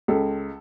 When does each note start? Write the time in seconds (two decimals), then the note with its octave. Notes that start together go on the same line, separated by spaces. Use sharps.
0.08 C#2 A4